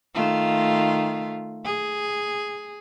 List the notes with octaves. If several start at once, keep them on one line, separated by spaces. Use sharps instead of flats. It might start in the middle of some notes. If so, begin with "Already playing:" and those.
D#3 A3 F4
G#4